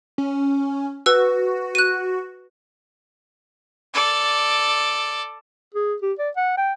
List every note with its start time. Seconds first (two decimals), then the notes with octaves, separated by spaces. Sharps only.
0.18 C#4
1.06 F#4 B4 E6
1.75 F#6 D#7
3.94 A4 D5
5.75 G#4
6.02 G4
6.19 D5
6.37 F#5
6.57 G5